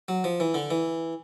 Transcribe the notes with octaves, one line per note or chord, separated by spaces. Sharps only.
F#3
F3
E3
D3
E3